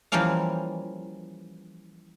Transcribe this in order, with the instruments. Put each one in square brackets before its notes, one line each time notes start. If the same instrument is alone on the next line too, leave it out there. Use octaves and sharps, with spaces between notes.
[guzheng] E3 F3 G3 A#3 C#4 F5